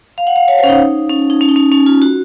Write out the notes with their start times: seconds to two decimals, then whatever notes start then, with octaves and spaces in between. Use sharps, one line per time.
0.18 F5
0.27 F#5
0.36 F5
0.48 C#5
0.59 C5
0.64 C#4
0.69 D#4
1.09 C#4
1.30 D#4
1.41 C#4
1.49 D#4
1.56 C#4
1.72 C#4
1.86 F4
2.02 F#4